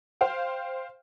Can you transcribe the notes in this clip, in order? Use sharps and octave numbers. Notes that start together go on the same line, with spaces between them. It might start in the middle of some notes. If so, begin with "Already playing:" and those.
C5 F5 G5